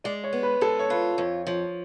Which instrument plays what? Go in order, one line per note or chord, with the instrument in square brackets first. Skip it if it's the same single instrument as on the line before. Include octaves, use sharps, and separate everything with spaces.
[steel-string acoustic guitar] G#3 [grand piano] D5
[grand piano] C#5
[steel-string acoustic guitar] B3
[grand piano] B4
[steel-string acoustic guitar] G#3 [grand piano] A4
[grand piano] C#5
[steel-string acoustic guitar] F4 [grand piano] B4
[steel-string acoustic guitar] F2 [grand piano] C#5
[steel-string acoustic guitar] F3 [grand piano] C#5